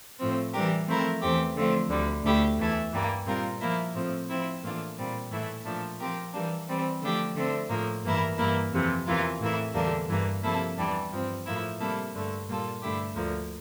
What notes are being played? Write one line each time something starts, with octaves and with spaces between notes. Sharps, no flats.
A2 F3 C4
E3 G3 D4 G4 A#4
F3 A3 C4 E4 A#4
E2 E3 A3 C4 G4
D3 F3 A3 C4 F4
D2 D3 G3
D2 D3 A3 E4 G4
E2 E3 A3 E4
G2 E3 G3 A#3
A#2 G3 C4 F4 A#4
F3 A#3 E4 A#4
A2 F3 C4
F3 C4 E4
A2 E3 A#3 D4 F4
A#2 G3 C4
A2 E3 A3 E4
A#2 F3 A3 D4
F3 C4 G4 A#4
E3 G3 A#3 D4
E3 G3 C4
D3 F3 A3 D4 G4
D3 A3 C4
A2 F3 A#3
G2 E3 A#3 E4 A#4
G2 E3 A#3 E4 A#4
F2 C3 E3
E2 C3 E3 A#3 F4
A2 E3 A#3 E4
E2 D3 G3 A#3 D4
G2 E3 A#3
C3 F3 A#3 E4 A4
E2 E3 G3 D4
G2 F3 C4
A2 F3 A#3 E4
C3 G3 A#3 E4 A4
G2 D3 A3
A#2 G3 A#3 F4 A4
G2 D3 A3 E4 G4
D2 D3 F3 A#3